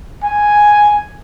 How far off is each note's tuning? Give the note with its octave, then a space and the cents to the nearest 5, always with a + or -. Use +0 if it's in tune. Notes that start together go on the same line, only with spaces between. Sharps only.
G#5 +0